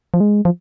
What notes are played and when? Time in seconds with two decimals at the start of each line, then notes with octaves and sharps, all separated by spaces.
0.14 F3
0.20 G#3
0.45 F3